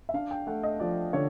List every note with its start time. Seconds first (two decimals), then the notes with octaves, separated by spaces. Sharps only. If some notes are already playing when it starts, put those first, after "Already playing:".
0.09 E5
0.14 D4 F5
0.31 G5
0.47 A3 F#5
0.63 D#5
0.80 F3 D5
1.13 D3 C#5